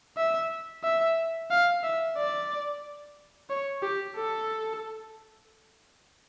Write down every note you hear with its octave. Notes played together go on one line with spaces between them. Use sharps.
E5
E5
F5
E5
D5
C#5
G4
A4